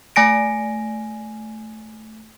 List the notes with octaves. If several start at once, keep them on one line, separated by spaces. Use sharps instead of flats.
A3 G#5 A#6 D7